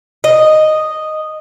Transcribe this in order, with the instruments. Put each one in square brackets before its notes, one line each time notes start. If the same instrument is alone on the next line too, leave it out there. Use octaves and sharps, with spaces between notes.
[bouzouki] D#5